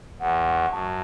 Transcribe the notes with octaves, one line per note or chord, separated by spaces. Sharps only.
E2 F#5
C#6
F#2 A5